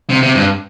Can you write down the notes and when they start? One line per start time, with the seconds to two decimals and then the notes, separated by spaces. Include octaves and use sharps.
0.10 C3
0.23 C3
0.35 G2